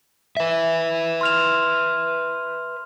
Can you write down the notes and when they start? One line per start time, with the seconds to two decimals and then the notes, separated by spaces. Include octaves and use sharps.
0.37 B4 E5
1.21 C6 F6 F7